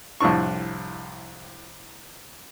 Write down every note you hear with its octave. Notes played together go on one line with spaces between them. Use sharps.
C2 F2 A2 D4 C#6